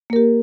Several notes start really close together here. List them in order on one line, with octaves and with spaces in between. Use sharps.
A#3 A#4 G4